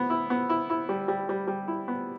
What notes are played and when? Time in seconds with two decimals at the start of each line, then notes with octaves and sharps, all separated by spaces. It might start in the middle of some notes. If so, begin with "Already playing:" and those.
Already playing: B3
0.10 E4
0.30 B3
0.50 E4
0.70 E4
0.89 G3
1.08 G3
1.29 G3
1.48 G3
1.68 E4
1.88 B3